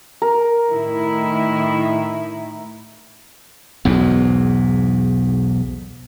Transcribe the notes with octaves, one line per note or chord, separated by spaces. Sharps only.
A#4
A2 D#3 E4
B1 E2 G#2